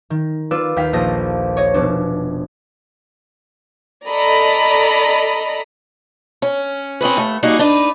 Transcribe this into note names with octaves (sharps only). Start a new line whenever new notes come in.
D#3
F4 B4 D5 E6
D#2 G4 F5 G5 B6
A#1 F4 A4 D#5 A#6
C#5 D#5
F1 B2 D4
A4 D5 D#5 A#5 B5
C#4
C4 C#4 G#4 B4
D#2 A3
G3 A#3 D#4 F#4 G#4
D4 D#4 B4